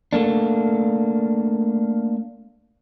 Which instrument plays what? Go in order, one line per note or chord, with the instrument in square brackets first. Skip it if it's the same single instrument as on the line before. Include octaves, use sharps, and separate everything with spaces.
[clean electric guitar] A3 A#3 D4